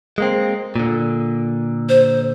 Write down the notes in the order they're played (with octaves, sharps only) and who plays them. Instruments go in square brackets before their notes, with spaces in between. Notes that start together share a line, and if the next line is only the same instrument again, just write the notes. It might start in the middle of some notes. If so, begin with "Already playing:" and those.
[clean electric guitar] G#3 A#3 C4
A#2 D3
[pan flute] C5